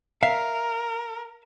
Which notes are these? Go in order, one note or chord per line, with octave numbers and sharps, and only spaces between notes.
A#4 E5 F5